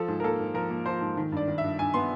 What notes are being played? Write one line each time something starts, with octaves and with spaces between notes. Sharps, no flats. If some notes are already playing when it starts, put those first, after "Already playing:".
Already playing: F3 A4
G#2
A#4
A#3 A4
G#2
F3 A#4
A#3
F3 C5
G#2
D#3
G2 D5
D#3
E5
G2
G2 G#5
B3 C6